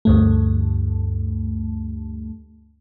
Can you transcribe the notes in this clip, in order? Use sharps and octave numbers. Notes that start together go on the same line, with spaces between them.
D2 G2 A3